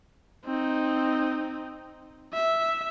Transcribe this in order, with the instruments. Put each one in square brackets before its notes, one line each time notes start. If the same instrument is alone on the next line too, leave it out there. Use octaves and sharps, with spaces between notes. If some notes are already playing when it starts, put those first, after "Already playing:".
[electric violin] C4 D#4
E5